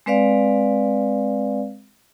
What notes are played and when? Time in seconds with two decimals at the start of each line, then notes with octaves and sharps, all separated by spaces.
0.06 G#3 C4 B4 D5 F5